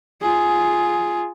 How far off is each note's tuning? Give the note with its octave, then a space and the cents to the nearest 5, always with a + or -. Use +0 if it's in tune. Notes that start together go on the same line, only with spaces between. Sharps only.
F4 +0 G#4 +5